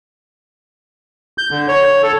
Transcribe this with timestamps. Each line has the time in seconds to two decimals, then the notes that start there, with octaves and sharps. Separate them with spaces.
1.38 G6
1.51 D3
1.68 C#5
2.03 A4